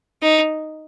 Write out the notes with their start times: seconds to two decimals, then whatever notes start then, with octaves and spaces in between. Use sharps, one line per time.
0.22 D#4